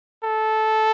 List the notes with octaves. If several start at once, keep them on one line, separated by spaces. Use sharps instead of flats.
A4